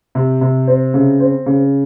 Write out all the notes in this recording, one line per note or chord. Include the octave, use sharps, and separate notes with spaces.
C3
C3
C4
C#3
C4
C#3